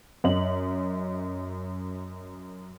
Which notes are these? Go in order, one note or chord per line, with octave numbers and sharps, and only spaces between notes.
F#2 D#5 F#7